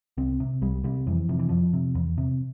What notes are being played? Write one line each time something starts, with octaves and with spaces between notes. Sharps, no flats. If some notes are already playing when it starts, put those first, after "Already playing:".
C2 C4
C3
C2 G3
C3 G3
F2 E3
C3 F3
E3
F2 F3
C3
E2
C3